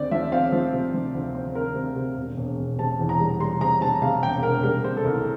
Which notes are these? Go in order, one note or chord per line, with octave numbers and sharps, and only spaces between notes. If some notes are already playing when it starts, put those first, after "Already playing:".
Already playing: D2 C4 D5
F3 E5
C4 F5
F3
C3
F3
D2
C4
C4 A#4
C3
C3
E1
E1
E1
C3 A5
E2
A#5
G3
G3 C6
C3 A#5
C3 A5
C3 F5
E1 G5
E1 A#4
G3 A#4
C3 C5
A4
C2 A#4